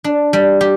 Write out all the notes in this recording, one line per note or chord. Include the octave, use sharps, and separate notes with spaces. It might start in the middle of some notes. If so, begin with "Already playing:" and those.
D4
G3
G4